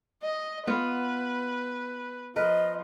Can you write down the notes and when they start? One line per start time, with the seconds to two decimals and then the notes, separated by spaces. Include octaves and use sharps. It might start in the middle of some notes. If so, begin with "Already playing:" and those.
0.23 D#5
0.67 B3 F4 B4
2.36 F3 A#4 B4 D#5